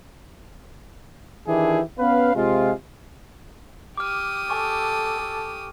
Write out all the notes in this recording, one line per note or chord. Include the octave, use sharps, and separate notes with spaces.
D#3 E3 D4 E4 G4 G#4
B3 C#4 B4 F5
C3 G#3 F4
G4 D6 D#6 F6
A4 G#5 C#6